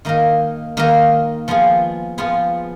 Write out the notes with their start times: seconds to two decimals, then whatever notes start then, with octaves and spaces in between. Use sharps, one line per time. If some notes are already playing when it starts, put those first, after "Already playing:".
0.05 D#3 A#3 D#4 A#4
0.77 D#3 A#3 D#4 A#4
1.48 F3 B3 F4 G#4
2.18 F3 B3 F4 G#4